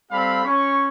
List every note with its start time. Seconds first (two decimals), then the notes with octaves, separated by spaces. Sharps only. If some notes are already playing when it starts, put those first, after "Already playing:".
0.11 G3 C4 G4 A4 F5 B5
0.44 C#4 C#6